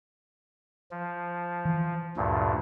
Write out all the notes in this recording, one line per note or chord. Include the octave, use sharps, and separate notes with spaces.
F3
E3
D2 G2 A#2